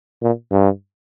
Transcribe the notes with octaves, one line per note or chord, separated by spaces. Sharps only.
A#2
G2